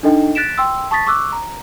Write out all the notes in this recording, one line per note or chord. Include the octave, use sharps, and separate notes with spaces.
D4 D#4 A4 D#5 G5
F#6 A6 B6 D7 E7
G5 C6 E6
A5 C#6 D#6 A6 B6
C#6 D6 E6 F#6
A#5